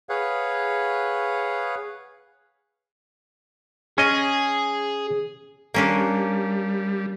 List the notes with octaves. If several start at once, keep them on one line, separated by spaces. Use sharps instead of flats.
G#4 B4 C#5 F5 F#5
C#4 G#4 D#5
G3 A#3 C#4 D4